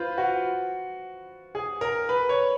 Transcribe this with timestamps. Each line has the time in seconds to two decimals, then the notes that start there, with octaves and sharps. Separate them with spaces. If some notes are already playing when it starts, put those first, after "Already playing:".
Already playing: F4 B4 C5
0.18 F#4
1.55 G#4
1.81 A#4
2.09 B4
2.29 C#5